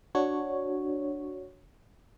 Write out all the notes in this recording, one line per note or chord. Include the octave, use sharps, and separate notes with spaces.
D4 F#4 C#5